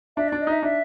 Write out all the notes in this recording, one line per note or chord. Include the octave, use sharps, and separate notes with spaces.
D4 E5
D5
D4
D#5
D#4 E5
D4 E5